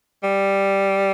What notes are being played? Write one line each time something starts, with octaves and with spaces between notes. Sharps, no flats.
G3